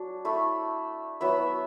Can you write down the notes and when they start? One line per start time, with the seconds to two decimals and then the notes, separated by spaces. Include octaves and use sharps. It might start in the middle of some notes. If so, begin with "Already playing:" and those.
Already playing: F#3 D4
0.25 A3 E4
1.21 F#3 B3 E4 E5